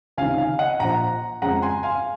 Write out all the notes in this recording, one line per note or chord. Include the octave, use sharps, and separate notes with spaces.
C#2 C3 D#3 F5 G#5
F5 G#5
D#5 F#5
A#1 A#2 F3 F#5 A#5
F2 C#3 G#3 C#4 F#5 A#5
G#5 C6
F5 G#5